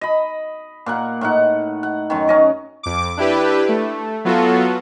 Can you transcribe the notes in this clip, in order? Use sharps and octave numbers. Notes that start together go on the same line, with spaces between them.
D#5 B5
A#2 A#4 F#5
A2 D#4 F#5
F#5
F#2 D#3
C#4 D#5 D6
F2 D6
D4 E4 G4 B4
A3
F#3 B3 F4 F#4 A4